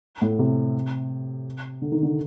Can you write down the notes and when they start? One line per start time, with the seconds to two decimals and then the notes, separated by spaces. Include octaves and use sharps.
0.22 A2
0.39 C3
1.82 D3
1.92 D#3
2.03 D3